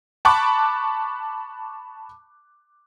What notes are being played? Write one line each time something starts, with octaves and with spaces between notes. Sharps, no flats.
A5 B5 C#6 D6 F#6